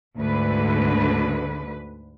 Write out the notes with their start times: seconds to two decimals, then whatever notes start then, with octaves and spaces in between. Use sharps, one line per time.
0.17 D2 G#2 D3 B4